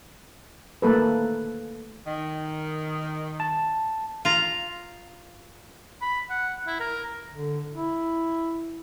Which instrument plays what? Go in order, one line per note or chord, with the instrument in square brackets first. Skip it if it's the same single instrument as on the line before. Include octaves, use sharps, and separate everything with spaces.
[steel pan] A3 A#3 A4 B4
[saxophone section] D#3
[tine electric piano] A5
[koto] F4 A#5
[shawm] B5
F#5
E4
A#4
[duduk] D3
E4